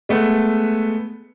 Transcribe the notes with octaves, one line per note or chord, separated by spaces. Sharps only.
G#3 A3 B3